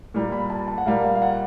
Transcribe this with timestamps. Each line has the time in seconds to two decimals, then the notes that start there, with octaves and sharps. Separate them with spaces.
0.14 A#2 G3 A#3
0.32 B5
0.50 A5
0.68 A5
0.78 F#5
0.86 A#2 G3 A#3 F5
1.04 F5
1.15 F5
1.22 F#5